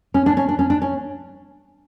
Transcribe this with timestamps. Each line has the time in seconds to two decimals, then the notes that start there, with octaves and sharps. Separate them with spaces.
0.14 C#4
0.26 D4
0.37 C#4
0.49 D4
0.59 C#4
0.70 D4
0.82 C#4